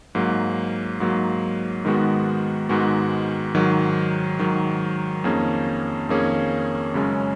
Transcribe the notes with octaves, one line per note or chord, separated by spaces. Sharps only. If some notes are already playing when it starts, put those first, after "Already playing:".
G#2 F#3 A#3
G#2 F#3 A#3
G#2 D#3 G#3 B3 F#4
G#2 D#3 G#3 B3 F#4
G#2 D#3 F#3
G#2 D#3 F#3
F2 D#3 A#3 C#4 G#4
F2 D#3 A#3 C#4 G#4
F#2 C#3 G#3 C#4